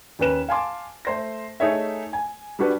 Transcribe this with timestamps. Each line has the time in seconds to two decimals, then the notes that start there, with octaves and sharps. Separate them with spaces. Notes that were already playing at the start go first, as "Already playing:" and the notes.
0.19 D#2 C#4 B4 E7
0.49 F5 G#5 A5 C6 D6
1.05 A3 C5 A#6
1.60 A3 D#4 G#4 C#5 E5
2.13 G#5
2.59 G3 D4 F#4 B4